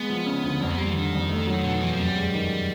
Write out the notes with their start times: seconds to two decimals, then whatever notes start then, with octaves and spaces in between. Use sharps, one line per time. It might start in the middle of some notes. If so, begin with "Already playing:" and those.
Already playing: G#3 B3
0.10 F3
0.26 C#3
0.43 D2
0.61 F2 A#3
0.70 B3
0.78 G3 A#3
0.87 E3
0.95 D3 D#3
1.13 F2
1.29 A3
1.47 F#3
1.64 B2 D3
1.73 D#3
1.81 E2 E3
1.91 F3
1.99 F#2 G3
2.15 G#3
2.33 D#3